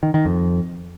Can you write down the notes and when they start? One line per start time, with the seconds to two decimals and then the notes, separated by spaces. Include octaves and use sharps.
0.03 D#3
0.14 D#3
0.25 F2